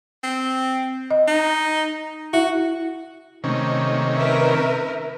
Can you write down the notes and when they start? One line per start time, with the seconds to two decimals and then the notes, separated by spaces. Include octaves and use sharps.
0.23 C4
1.11 D#5
1.27 D#4
2.33 E4 F#4 E5
3.44 C3 D#3 A3 C#4
4.15 A#4 B4 E5